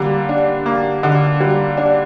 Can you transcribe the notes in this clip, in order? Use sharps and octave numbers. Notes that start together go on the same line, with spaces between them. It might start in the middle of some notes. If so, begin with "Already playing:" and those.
Already playing: D3 G3 A#3
D4
A#3
D3
G3
D4